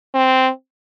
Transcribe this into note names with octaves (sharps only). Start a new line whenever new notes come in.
C4